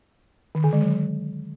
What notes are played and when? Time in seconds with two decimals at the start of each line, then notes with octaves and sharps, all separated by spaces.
0.55 D#3
0.64 D3
0.73 G#3
0.82 F#3